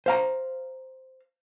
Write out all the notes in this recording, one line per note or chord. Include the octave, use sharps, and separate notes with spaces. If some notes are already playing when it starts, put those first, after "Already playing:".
C5 F5 A#5